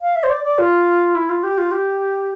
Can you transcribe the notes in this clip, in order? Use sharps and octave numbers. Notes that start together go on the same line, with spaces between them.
F5
E5
C5
D5
D5
F4
E4
F4
G4
F4
G4